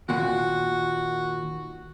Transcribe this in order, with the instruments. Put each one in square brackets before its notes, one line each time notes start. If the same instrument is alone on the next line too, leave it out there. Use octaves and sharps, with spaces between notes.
[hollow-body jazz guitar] D#2 A#2 [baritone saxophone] F#4